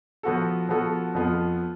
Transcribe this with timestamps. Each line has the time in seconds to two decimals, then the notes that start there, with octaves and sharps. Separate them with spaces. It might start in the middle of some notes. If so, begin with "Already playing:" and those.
0.23 F3 B3 F#4 A4
0.69 F3 B3 F#4 A4
1.15 F2 F3 B3 F4